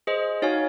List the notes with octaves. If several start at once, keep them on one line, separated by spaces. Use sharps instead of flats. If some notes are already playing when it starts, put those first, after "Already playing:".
G#4 C5 D#5
D#4 F#4 C#5 F5 G#5